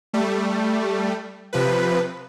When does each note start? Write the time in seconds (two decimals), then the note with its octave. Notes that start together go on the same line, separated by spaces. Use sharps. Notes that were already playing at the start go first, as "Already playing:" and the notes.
0.14 G3 A3
1.53 C3 F3 B4